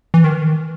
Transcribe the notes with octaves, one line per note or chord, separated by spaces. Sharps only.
E3
D#3